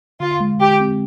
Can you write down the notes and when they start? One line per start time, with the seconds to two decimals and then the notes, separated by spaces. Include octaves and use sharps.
0.20 D3 F4
0.41 G#3
0.60 D3 G4
0.80 C4